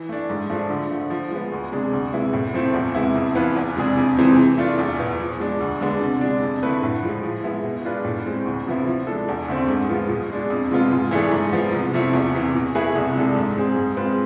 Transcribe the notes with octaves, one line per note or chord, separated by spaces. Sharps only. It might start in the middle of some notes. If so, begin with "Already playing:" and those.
Already playing: E3
A3 D4
G#2
F3 A3 D4 A4
D3
F3 A3
F3
G#3 B3
D2
C3 G#3 D4 G#4
D2
C3 G#3 B3 E4
A2
F3 A3 C4 E4
E2
C3 G#3 B3 E4
F2
E3 B3 F4 B4
E2
C3 G#3 D4 G#4
F2
C3 E3 G#3 C4
E3
A3 D4 F4
E2
B2 B3
F3
G#3 D4
D2
D3 G#3 B3 D4
C3
G#3 D4
F2
D3 A3 E4 B4
A2
F3 G#3
F3
G#3 B3 E4
B2
G#3 D4 F4 B4
A2
G#3 C4
D2
C3 F3 B3 E4
F3
G#3 D4 A4
E2
D3 A3 C4
G#2
F3 G#3 B3 F4
B2
G#3 D4
F2
C3 G#3 B3 F4
G#2
E3 A3 D4 G#4
G#2
F3 B3
C2
C3 F3 A3 E4
E2
C3 E3
B2
A3 E4 G#4 B4
C2
C3 G#3 D4 A4
G#2
G#3 C4 G#4
G#2
G#3 C4 F4 B4